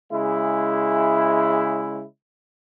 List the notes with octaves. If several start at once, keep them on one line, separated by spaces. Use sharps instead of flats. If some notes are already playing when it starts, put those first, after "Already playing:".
C#3 G#3 E4